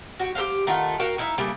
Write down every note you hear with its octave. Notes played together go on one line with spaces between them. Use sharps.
F#4 G4
G4 A4 C5 F5
D#3 A3 F4 F#5
F#4 A#4 F5 G5
D#4 E4 E5 F5
C#3 G3 A3 A#3